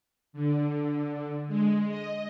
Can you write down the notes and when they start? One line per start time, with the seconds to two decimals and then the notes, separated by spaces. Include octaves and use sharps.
0.33 D3
1.48 G#3
1.88 D#5